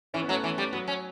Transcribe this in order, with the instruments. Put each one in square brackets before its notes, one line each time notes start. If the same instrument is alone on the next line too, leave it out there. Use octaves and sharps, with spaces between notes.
[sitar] E3 [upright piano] C#4 E4
[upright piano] B3
[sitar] F#3 [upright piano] A3 C#4
[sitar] E3
G3
[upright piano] F#3 [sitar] B3
[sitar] C#4